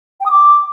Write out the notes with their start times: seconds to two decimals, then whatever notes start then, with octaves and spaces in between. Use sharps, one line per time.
0.20 G5
0.26 D#6
0.31 D6